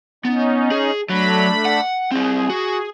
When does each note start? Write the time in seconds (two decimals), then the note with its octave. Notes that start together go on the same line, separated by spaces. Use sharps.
0.25 B3 C#4 D#4
0.71 G#4
1.09 F#3 A3 D4 B5
1.65 F#5
2.11 C4 E4 G#4
2.50 F#4